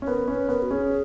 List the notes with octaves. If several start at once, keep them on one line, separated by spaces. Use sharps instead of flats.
C#4
B3 A#4
C#4 B4
B3 A#4
F#4
C#4 G#4